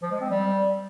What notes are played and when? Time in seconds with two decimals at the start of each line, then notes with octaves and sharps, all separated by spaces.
0.02 F3
0.12 G#3
0.21 C4
0.30 G3